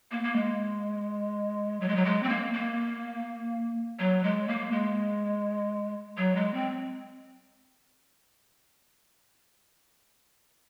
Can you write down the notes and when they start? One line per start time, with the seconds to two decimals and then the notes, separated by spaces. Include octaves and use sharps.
0.11 A#3
0.24 A#3
0.36 G#3
1.80 F#3
1.88 G#3
1.96 F#3
2.05 G#3
2.23 C4
2.29 A#3
2.54 A#3
3.99 F#3
4.23 G#3
4.48 A#3
4.72 G#3
6.17 F#3
6.36 G#3
6.54 C4